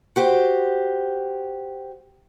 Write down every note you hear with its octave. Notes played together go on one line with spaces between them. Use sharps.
F#4 G4 C5